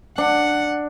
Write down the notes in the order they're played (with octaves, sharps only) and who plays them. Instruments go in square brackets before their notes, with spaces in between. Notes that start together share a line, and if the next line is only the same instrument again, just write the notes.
[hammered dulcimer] D4 [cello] F#5